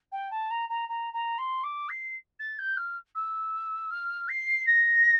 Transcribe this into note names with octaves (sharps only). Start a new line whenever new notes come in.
G5
A5
A#5
A#5
A#5
A#5
C6
D6
C7
A6
G6
F6
E6
F6
C7
A#6